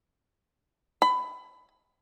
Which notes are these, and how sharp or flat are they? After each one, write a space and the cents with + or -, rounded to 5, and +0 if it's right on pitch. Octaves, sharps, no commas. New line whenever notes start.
B5 +20